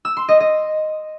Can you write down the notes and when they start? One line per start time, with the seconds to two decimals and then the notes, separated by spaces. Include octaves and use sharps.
0.05 E6
0.17 C6
0.29 D#5
0.40 D#5